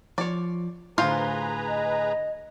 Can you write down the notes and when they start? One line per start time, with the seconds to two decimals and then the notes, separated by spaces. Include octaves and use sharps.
0.18 F3 C#5 D5
0.98 A2 D3 F4 G#4 B4 C5 A#5
1.68 D#5